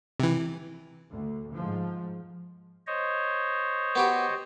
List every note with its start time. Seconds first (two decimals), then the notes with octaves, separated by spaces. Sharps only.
0.20 C3 E3
1.12 D2
1.55 G#2 F3
2.87 C5 C#5 D#5
3.95 B3 F#4 G4